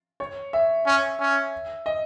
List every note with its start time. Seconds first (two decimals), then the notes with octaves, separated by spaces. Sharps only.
0.20 C#5
0.53 E5
0.86 C#4
1.20 C#4
1.86 D#5